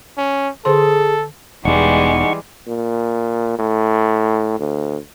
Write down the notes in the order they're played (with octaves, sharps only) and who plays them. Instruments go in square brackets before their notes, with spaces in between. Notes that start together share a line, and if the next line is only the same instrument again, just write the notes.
[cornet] C#4
[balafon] D3 C5 C6 [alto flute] G#4 [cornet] A4
[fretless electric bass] E1 E2 [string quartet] E3 G3 G#3 [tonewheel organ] D#4 F#5 C#6
[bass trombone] A#2
A2
D2